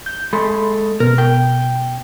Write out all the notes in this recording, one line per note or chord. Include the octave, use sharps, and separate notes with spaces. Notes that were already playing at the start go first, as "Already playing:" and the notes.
G6
G#3 A4 B5 C6
B2 B3 A#4
G5